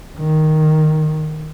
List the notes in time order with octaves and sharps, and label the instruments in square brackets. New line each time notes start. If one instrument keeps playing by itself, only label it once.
[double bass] D#3